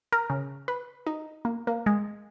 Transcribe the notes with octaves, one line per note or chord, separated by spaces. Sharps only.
A#4
C#3
B4
D#4
A#3
A#3
G#3